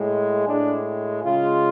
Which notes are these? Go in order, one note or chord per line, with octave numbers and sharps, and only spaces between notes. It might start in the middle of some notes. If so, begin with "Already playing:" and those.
Already playing: A2 G#3
A2 G#3 D4
C#3 G#3 F4